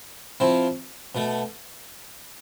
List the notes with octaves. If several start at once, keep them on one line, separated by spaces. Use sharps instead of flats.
F3 C4 E4
B2 A3